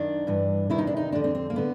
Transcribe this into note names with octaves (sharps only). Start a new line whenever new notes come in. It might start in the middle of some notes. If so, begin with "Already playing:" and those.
Already playing: F#2 D#3 D4
G2 E3
E2 C3 D#3 E4
D#4
D4
D#4
F2 D3 D4
C4
C4
A#3
D3 B3